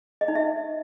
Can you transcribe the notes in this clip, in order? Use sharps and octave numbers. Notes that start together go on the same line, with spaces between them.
D#5
D#4
E5